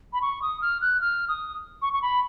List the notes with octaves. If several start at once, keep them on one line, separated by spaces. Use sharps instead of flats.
B5
C#6
D#6
F6
F#6
F6
D#6
C#6
C#6
B5